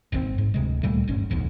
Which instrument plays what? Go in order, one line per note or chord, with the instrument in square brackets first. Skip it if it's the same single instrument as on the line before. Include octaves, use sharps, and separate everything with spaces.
[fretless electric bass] D#1 G#1 D#2 C4
G#2
D1 D2 C3 G#3
D2 A#2 G3 A3
D#1 G#1 G2 C#4
D1 B1 E2 A2